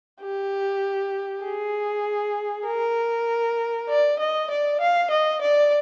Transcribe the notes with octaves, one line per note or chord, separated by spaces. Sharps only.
G4
G#4
A#4
D5
D#5
D5
F5
D#5
D5